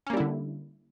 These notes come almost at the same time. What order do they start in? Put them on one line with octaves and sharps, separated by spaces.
C#4 A#3 G3 E4 D3